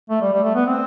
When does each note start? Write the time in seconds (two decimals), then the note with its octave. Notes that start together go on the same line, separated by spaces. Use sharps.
0.10 A3
0.21 G3
0.33 G3
0.44 A3
0.55 B3
0.67 C4